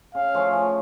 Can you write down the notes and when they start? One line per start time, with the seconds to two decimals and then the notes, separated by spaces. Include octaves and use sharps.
0.15 C#3 F5
0.34 F3 A3 C#4
0.53 F3